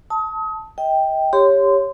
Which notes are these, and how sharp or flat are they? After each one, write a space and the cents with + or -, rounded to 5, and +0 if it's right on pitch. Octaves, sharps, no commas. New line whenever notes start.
A5 +5 D#6 +35
D#5 +35 G5 +0
G4 +15 C#5 +0 C6 -25